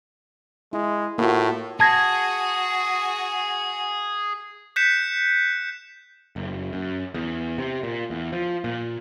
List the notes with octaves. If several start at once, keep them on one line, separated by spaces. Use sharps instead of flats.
G#3 E4
A2 A#3 F4 F#4
F#4 G#4 G#5 A5 G#6 A#6
F#6 G6 B6 C#7 E7
F#1
F#2
E2
C3
A#2
E2
F3
A#2